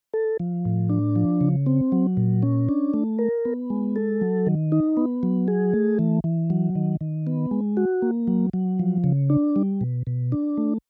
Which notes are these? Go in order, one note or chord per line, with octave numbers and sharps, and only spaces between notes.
A4
F3
A2
D4
F3
C#3
C4
F#3
A#2
C#4
D4
A3
A#4
B3
G#3
A4
F#3
D#3
D#4
B3
F#3
G#4
A3
E3
E3
F#3
D#3
D#3
B3
G#3
F#4
A#3
F#3
F#3
F3
C#3
D4
G3
B2
B2
D4
A3